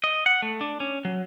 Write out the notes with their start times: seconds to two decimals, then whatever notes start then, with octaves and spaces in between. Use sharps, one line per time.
0.04 D#5
0.26 F#5
0.42 A3
0.61 D4
0.80 C#4
1.05 F#3